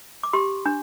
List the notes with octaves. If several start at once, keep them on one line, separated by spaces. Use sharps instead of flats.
D6
G4 C6
D4